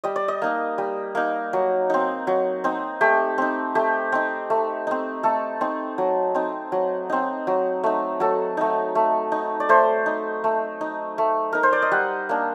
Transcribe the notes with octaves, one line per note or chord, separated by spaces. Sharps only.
G3 D#5
D5
D#5
A#3 D#4
G3
A#3 D#4
F#3
C4 D#4
F#3
C4 D#4
A3 G4
C4 D#4
A3 G4
C4 D#4
A3
C4 D#4
A3 A4
C4 D#4
F#3
C4 D#4
F#3
C4 D#4
F#3
A3 D#4
F#3 A4
A3 D#4
A3
D#4
D5
A3 C5
D#4
A3
D#4
A3
D#4 A#4
C5
D5
D#5
G3 F#5
A#3 D4